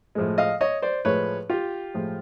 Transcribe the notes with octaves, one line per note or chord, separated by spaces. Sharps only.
A2 F3 G#3
D#5 F5
C#5 D#5
C5 D5
A2 F3 G#3 B4 C#5
F4 G4
A2 F3 G#3